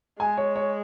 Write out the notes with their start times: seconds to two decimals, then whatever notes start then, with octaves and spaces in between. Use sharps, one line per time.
0.19 G#3 G#5
0.37 C#5
0.56 C#5